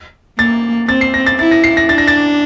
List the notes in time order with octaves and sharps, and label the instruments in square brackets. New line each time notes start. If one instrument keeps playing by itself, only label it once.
[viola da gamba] A#3 [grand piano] A6
[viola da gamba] C4 [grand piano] A6
[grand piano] C7
A#6
A6
[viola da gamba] E4 [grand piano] A6
[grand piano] A#6
C7
A#6
[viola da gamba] D4 [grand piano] A6
[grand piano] A#6
A6